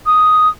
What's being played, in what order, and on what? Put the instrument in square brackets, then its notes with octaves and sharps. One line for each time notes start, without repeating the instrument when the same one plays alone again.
[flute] D#6